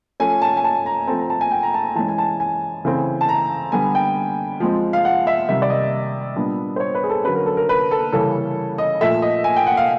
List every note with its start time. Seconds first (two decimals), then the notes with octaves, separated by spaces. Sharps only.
0.20 F3 A3 C#4 G#5
0.42 A5
0.57 G#5
0.64 A5
0.86 A#5
1.07 F3 A3 C4 A5
1.20 A#5
1.30 A5
1.41 G#5
1.51 G5
1.63 A#5
1.74 A5
1.95 E3 G#3 C#4 A5
2.08 G#5
2.18 A5
2.40 G#5
2.85 C#3 E3 A3 C4
3.21 A5
3.29 A#5
3.72 D3 G3 B3 G#5
3.95 G5
4.60 F3 G#3 C4
4.93 F5
5.05 F#5
5.27 E5
5.49 C3 D#3 G3 E5
5.62 D5
5.70 D#5
6.36 A#2 G3 B3 D4
6.76 C5
6.80 C#5
6.95 B4
7.04 G#4
7.10 A4
7.24 D3 F#3 A#3 C#4 B4
7.36 A#4
7.46 A4
7.57 A#4
7.69 B4
7.91 A4
8.13 C#3 E3 G3 A#3 C#4 A4
8.78 D#5
9.01 A#2 F3 A3 E5
9.22 D#5
9.44 G#5
9.56 G5
9.67 F#5
9.77 F5